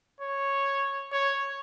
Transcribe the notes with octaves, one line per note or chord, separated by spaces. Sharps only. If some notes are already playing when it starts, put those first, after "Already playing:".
C#5
C#5